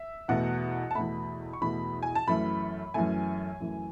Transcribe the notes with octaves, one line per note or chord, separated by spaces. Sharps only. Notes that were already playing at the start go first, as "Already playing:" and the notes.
Already playing: E5
E2 B2 A3 F#5
A5
E2 B2 A3 B5
C#6
E2 B2 A3 B5
G#5
A5
F#2 E3 A3 B5
F#2 E3 A3 G#5
F#2 E3 A3